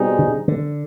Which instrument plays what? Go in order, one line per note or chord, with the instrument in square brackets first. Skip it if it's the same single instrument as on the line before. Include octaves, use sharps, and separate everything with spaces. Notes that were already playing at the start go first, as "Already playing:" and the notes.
Already playing: [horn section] B2 G3 C4 D#4 G#4
[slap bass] D3
D3